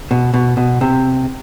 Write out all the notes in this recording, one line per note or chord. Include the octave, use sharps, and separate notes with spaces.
B2
B2
B2
C3